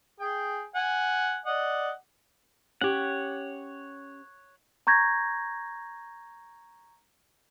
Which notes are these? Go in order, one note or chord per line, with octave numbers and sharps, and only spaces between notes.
G#4 G5
F#5 G#5
D5 D#5 F#5
C#4 G4 C#5 F#5
A#5 C#6 G6 G#6 A#6